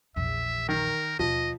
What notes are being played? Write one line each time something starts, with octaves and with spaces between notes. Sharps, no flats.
A#1 E2 E5
D#3 A#4
D#2 B2 F3 D#5